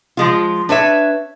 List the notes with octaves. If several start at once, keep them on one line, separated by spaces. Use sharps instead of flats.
F3 G#3 F4
D4 B4 C#5 E5